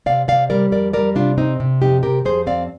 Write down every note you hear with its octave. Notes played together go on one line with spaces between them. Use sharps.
C3 D5 F5
C3 D5 F5
G3 A#4 D5
F2 A#4 D5
G3 A#4 D5
C3 D4 F4
C4 D#4
C3
F2 D#4 G4
C3 G4 A#4
F2 G#4 C5
C4 D5 F5